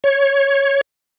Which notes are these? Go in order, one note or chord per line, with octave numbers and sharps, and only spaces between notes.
C#5